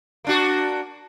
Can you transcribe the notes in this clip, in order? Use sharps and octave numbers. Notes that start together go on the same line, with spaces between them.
A#3 D4 F#4